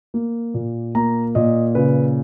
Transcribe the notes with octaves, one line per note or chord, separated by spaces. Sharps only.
A#3
A#2
A#3 A#5
A#2 D#5
C#3 B4